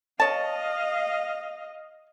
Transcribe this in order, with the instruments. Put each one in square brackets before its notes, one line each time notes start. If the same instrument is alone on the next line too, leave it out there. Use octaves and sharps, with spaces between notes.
[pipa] C#5 A5 [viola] D#5 F5